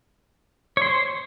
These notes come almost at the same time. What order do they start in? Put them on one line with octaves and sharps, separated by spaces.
C#5 C6 C5